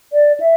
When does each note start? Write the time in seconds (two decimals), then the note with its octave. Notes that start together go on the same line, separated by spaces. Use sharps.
0.13 D5
0.40 E5